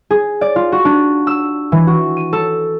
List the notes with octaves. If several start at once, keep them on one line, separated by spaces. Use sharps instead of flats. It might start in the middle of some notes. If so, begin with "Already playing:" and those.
G#4
D5
F4
F#4
D4
E6
E3
F#4
D#7
A4